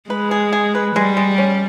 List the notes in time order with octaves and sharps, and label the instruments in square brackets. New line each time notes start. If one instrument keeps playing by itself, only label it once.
[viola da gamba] G#3 [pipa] B4
[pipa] G#4
G#4
B4
[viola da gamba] G3 [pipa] G#3
[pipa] G#3
C#4